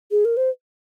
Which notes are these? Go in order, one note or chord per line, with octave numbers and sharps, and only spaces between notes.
G#4
A#4
C5